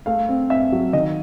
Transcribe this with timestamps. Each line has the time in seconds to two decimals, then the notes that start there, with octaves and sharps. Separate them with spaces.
0.06 A3 F5
0.29 C4
0.50 C4 E5
0.72 F#3
0.93 D#3 D#5